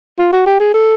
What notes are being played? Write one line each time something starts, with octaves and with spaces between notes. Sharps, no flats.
F4
F#4
G4
G#4
A4